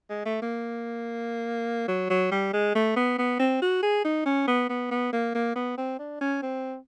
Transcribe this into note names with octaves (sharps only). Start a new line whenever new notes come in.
G#3
A3
A#3
F#3
F#3
G3
G#3
A3
B3
B3
C4
F#4
G#4
D#4
C#4
B3
B3
B3
A#3
A#3
B3
C4
D4
C#4
C4